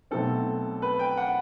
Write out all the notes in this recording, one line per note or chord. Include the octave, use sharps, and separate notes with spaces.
B1 B2 F#3 A3 C4 A4
B4
G5
F#5